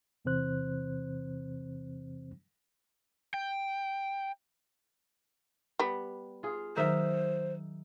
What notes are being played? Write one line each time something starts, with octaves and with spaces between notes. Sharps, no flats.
E2 C3 E3 C4 C5 F#6
G5
G3 B3
F4 G#4
D#3 F#3 D#4 A#4 C5 E5